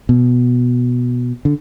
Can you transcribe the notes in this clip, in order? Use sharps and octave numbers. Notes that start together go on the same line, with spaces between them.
B2
D3